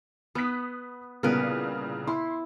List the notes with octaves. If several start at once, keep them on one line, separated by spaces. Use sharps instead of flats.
B3 D#6 F#6 B6
C2 A#2 C#3 B3 A#4 B4
E4 C6